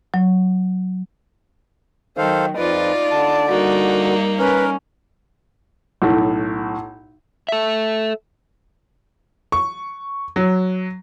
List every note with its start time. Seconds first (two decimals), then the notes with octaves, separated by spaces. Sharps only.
0.14 F#3
2.18 D#3 F#3 A4 C5 F5
2.57 F2 F3 D#4 F4 B4 D5
3.11 D3 A5
3.49 G3 A#3 D#4 F#4
4.39 C#4 A#4 B4
6.02 B1 A2
7.49 A4 E5
9.52 C#6
10.36 F#3